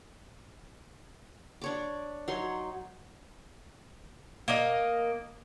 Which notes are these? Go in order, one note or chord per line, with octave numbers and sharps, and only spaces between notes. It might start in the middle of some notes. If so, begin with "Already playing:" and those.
D4 C#5 D6
F#3 D#4 C#5 C6
A#3 D#5